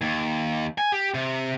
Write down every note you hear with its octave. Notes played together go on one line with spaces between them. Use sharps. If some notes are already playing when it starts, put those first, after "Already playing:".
D#2
G#5
G4
C3